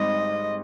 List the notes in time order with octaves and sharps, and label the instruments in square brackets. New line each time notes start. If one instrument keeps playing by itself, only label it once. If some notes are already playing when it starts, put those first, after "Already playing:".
Already playing: [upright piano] G#1 G#2 G3 C4 D#4 [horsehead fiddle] D#5